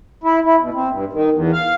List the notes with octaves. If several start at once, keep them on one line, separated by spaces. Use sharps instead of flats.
E4
E4
B2
C4
G2
D#3
E2
F5